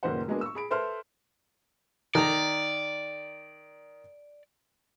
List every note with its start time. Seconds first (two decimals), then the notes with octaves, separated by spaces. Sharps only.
0.03 F#1 A#2 D#3 B4 C5 F#5
0.28 F#3 G#3 A#3 B3 D4 G#4
0.41 C#6 E6
0.55 G#4 B5 D7
0.71 A4 B4 C5 E5 C6 F6
2.15 D#3 D5 A#5